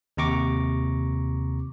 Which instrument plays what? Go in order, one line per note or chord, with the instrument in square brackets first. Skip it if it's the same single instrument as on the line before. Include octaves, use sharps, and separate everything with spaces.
[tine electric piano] D#2 C3 A#5 C#6 D6